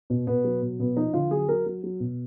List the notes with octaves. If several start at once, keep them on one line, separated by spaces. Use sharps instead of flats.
B2
B2 B3
F#3
B2
B2 B3
F3 D#4
D3 F4
F#3 G#4
F#3 A#4
F#3
F#3
B2